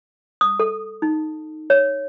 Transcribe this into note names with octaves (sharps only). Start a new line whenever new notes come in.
D#6
A4
D#4
C#5